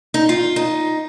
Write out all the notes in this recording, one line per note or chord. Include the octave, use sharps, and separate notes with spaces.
D#4
F4
D#4